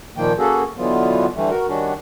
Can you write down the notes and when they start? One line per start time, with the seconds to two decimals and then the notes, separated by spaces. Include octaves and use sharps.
0.17 A#2 D#3 F3 A#3 G5
0.39 A#3 C#4 F#4 G#4 A4
0.78 B2 D3 E3 F#3 B3 F4
1.36 D3 E3 G3 A3
1.50 F#4 A#4
1.68 D#3 G3 C#4 D4 F#4